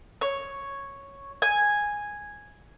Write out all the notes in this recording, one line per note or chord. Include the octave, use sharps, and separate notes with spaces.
C#5
G#5